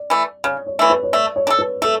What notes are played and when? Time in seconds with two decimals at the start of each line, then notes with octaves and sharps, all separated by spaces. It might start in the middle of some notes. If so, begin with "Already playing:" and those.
Already playing: D5
0.10 E3 A3
0.44 C#3 C#5
0.66 C#5
0.79 E3 A3
0.90 B4
1.03 C#5
1.13 A3 D5
1.36 C#5
1.47 D4
1.50 A4
1.59 B4
1.82 A3 A4